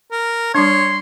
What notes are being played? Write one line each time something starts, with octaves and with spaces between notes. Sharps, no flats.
A#4
G3 D4 C#5 C6